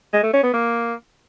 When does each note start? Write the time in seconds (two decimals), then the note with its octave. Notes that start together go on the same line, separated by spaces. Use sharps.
0.13 G#3
0.23 A3
0.33 C#4
0.43 B3
0.53 A#3